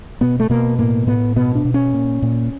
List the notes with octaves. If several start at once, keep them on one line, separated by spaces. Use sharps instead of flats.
B2 B3
A3
B2 A#3
A2 A#3
A2 B3
B2 B3
D4
B2
C#4
A#2
A#2